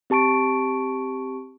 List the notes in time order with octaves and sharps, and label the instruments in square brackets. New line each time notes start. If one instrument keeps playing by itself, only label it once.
[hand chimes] C4 G4 A5 C#6 D7